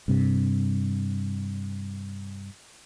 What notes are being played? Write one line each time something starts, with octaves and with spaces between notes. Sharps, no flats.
G2 C3